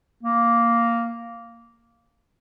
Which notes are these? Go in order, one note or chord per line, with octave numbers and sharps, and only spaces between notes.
A#3